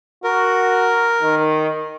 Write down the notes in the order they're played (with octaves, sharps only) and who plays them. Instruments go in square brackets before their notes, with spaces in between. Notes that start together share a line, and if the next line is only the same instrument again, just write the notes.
[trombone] F#4 [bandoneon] A#4
[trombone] D#3